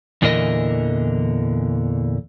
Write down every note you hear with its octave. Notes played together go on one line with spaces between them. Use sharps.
E2 A#2 D3 E3 A#4 D#5